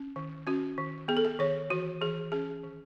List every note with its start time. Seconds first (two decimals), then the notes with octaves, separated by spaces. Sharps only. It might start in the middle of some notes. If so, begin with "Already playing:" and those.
Already playing: C#4
0.16 D#3
0.47 C#4 F#4
0.78 D#3
1.08 B3 G#4
1.17 A4
1.25 G#4
1.39 D#3 C#5
1.70 E3 F#4
2.01 E3 G#4
2.32 C#4 G#4
2.63 D#3